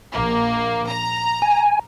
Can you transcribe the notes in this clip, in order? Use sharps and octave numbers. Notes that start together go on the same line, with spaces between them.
A#1 A#3
A#5
G#5